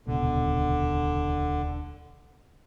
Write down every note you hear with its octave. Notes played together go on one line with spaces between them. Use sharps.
D#1 C#2 B2 D3